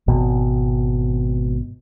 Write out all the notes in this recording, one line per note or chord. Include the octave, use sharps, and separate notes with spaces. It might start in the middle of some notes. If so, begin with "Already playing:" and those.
G#1 B2